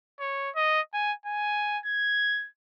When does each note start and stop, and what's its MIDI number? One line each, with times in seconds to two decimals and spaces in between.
0.20 0.50 73
0.56 0.81 75
0.94 1.13 80
1.26 1.78 80
1.86 2.48 92